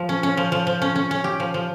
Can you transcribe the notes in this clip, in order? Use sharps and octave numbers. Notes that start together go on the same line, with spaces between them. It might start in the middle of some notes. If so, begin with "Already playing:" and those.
Already playing: F3
C#4
C#4
F3
F3
F3
C#4
C#4
C#4
G4
F3
F3